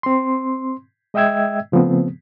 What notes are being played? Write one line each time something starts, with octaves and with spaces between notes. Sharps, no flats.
C4 C6
G#3 D#5 E5 G5 E6 G#6
C#3 F3 A3 B3 C4